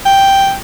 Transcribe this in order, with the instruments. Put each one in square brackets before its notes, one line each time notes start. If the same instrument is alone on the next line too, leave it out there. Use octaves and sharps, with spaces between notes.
[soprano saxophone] G5